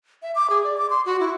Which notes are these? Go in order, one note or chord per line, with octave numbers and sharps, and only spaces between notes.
E5
D6
G#4
D5
D6
C6
F#4
E4